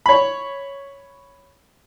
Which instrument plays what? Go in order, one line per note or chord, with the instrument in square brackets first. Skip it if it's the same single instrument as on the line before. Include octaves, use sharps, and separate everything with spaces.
[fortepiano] C#5 B5